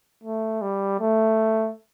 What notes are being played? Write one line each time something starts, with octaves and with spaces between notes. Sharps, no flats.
A3
G3
A3